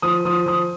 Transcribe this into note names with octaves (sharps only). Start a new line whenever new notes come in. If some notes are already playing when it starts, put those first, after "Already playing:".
F3 D#6
F3 D#6
F3 D#6